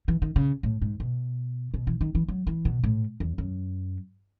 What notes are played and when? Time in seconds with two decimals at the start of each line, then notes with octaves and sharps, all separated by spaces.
0.08 E3
0.22 D#3
0.36 C#3
0.63 A2
0.82 G#2
1.00 B2
1.74 B2
1.87 E3
2.01 D#3
2.15 E3
2.28 F#3
2.47 E3
2.65 B2
2.84 A2
3.20 E2
3.38 F#2